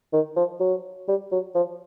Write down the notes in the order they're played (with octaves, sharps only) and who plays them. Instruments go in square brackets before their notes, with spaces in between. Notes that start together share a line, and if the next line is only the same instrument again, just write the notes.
[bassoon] D#3
F3
F#3
G3
F#3
F3